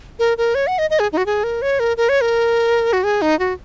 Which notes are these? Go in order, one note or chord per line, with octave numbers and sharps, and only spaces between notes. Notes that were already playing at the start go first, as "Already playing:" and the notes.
A#4
A#4
C#5
F#5
D#5
D#5
G#4
D#4
F#4
G#4
A#4
C#5
A#4
A#4
C#5
A#4
F#4
G#4
D#4
F#4